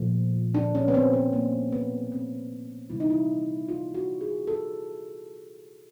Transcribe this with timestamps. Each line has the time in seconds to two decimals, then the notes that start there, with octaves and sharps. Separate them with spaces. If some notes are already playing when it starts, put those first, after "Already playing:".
Already playing: A#2 F3 A3
0.55 D4
0.75 C#4
0.88 B3
0.94 C4
1.13 B3
1.33 A#3
1.72 B3
2.12 C4
2.90 C3 E3 G3 E4
3.00 D#4
3.10 E4
3.69 F4
3.94 F#4
4.21 G#4
4.47 A4